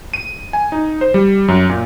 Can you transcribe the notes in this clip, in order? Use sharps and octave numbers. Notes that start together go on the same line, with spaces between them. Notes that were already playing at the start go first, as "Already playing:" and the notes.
D#7
G#5
D#4
C5
G3
F#2
A#2